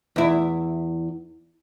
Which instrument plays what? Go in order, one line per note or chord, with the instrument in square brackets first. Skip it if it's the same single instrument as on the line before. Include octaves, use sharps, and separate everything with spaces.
[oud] E2 E4